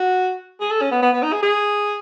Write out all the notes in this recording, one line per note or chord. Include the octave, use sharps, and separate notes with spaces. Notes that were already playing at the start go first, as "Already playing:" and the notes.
Already playing: F#4
G#4
A4
C#4
B3
B3
B3
D#4
G#4
G#4